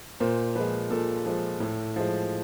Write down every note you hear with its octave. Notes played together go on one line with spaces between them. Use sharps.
A#2 C5
F3 G#3 B4
A#2 A4
F3 G#3
A2
F3 G#3